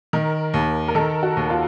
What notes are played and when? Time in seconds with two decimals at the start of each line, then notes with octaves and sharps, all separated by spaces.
0.13 D#3 A#4
0.54 D#2
0.88 A#4
0.95 D#3 A4
1.23 F#4
1.37 D#2
1.50 F4